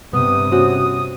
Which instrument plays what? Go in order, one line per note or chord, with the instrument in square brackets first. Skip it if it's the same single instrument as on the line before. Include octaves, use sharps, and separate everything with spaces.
[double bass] G2 C3 [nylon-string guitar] B3 [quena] D#6
[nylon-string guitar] C#4 F#4 C5